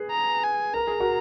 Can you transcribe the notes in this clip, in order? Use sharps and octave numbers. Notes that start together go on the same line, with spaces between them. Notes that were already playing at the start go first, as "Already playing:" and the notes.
Already playing: G#4 B4
A#5
G#5
A#4 A#5
G#4
F#4 A#4